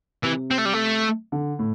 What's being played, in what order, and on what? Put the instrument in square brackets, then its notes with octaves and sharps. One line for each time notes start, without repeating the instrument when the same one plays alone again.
[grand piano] C3 [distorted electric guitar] E3
[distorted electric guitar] C4
A3
G3
A3
[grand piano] D3
A2